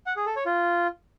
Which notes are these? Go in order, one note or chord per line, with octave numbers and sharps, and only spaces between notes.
F#5
G#4
A4
C#5
F4